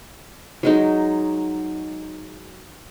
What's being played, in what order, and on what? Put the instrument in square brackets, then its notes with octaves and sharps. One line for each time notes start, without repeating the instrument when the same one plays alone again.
[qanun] F#3 G#3 D#4